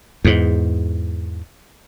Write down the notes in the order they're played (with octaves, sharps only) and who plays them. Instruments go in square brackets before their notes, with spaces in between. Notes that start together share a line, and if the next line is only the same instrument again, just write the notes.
[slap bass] E2 G#2